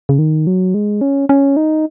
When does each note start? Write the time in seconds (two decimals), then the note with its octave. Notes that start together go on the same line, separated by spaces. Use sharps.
0.09 C#3
0.19 D#3
0.47 F#3
0.74 G#3
1.01 C#4
1.29 C#4
1.57 D#4